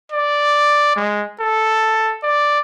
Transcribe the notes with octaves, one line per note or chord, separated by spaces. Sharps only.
D5
G#3
A4
D5